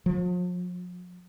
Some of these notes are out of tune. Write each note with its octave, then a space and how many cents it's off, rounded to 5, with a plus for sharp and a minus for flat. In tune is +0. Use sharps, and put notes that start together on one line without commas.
F3 +40